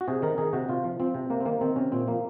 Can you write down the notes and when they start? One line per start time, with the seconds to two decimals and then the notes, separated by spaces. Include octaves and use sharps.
0.01 F#4
0.08 C3 G#4
0.22 D#3 A#4
0.38 D#3 G#4
0.53 C3 F#4
0.69 C3 F4
0.84 F3
1.00 F3 C4
1.14 C3
1.30 C3 A#3
1.40 C4
1.45 D#3 A#3
1.61 D#3 C4
1.76 C3 C#4
1.92 A#2 C4
2.07 F3 A#3